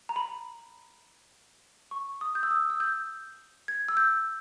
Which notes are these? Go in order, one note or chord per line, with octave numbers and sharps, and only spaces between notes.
A#5
B5
C#6
D#6
G6
E6
D#6
E6
G6
G#6
E6
G6